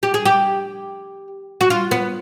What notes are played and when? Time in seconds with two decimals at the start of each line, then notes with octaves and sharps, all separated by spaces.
0.03 G4
0.14 G#4
0.25 G4
1.61 F#4
1.70 F4
1.91 B3